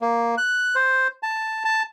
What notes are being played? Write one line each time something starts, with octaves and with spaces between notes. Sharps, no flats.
A#3
F#6
C5
A5
A5